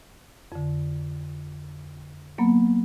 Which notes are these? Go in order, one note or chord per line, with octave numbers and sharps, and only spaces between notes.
F2 D3
F#3 A#3 B3